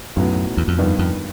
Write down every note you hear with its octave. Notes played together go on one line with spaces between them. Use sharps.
B1 F#2 A2 F#3 B3
E2
F2
G2 D#3 G3 B3
F2